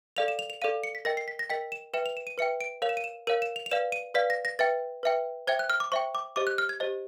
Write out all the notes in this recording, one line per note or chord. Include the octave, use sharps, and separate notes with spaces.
A4 D5 F5 F7
E7
F7
F7
A4 D5 F5 D#7
C#7
B6
A#4 D#5 G5 A#6
C7
B6
A#6
A#4 D#5 G5 B6
E7
B4 E5 G5 E7
F7
E7
D#7
B4 E5 G5 C#7
D7
A#4 C#5 F5 F7
E7
D#7
E7
A#4 C#5 F5 D#7
E7
F7
F7
B4 D5 F5 E7
D#7
B4 D5 F5 B6
A#6
A#6
B4 E5 G5 A6
B4 E5 G5
C5 E5 G5 G#6
F#6
F6
D6
C5 E5 G5 C#6
D6
G4 C5 D#5 D6
F#6
F6
G#6
G4 C5 D#5